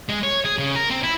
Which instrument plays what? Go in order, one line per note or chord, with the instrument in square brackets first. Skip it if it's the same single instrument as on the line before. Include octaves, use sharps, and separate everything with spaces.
[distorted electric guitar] G#3
C#5
G#4
C#3
A#4
C4
E4